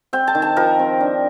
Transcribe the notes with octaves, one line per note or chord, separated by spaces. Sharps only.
C4 G5
A5
D#3
A5
F3 A#4
C4
D4